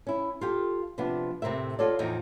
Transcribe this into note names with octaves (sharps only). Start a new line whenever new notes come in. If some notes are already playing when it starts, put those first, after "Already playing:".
C#4 E4
F4 G4 A4
C3 F3 B3 D4
A2 C3 C4 A#4 E5
F4 F#4 A4 C#5 D5
E2 A2 F3 D#4 D#5